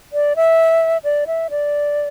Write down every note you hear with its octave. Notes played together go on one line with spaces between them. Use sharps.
D5
E5
D5
E5
D5